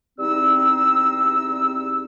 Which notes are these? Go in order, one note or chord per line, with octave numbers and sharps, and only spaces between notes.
E2 G3 C4 D#4 E6